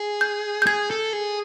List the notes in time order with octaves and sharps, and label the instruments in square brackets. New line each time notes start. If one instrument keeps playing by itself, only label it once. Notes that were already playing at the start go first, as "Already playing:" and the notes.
Already playing: [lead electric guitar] G#4
[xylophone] G6
G6
[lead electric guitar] G#4 [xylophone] G#6
[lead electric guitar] A4
G#4